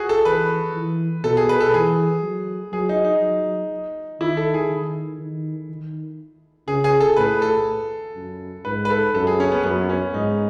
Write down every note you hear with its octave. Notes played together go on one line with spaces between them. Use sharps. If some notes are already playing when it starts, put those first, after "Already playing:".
Already playing: F#4 G#4
A4
E3 B4
E3
B2 A4
G#4
B4
A4
E3 G#4
F#3
F#3 G#4
D#4
D#4
F#3
D#3 E4
A4
G#4
D#3
D#3
D#3
C#3 G#4
G#4
A4
A2 B4
A4
F#2
G#2 B4
B4
A4
F#2 A4
G#4
C#4
B3
F#2 B3
C#4
G#2 D#4